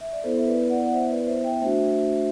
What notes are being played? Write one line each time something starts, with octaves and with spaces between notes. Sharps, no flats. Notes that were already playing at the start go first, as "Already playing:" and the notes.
E5
D5
B3 E4 A4 C5
E5
B4 D5
D5 F#5
F#5
C5 E5
B4 D5
C5 E5
E5 G5
A3 D4 F#4 C5 E5